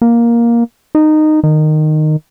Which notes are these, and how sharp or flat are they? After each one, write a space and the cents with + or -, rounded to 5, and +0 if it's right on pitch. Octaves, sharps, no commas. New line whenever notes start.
A#3 +10
D#4 -15
D#3 -15